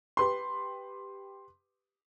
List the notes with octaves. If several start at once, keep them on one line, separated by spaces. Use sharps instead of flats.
G4 B4 C6